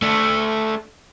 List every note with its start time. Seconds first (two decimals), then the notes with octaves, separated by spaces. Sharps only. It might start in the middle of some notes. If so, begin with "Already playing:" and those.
0.02 A3 D4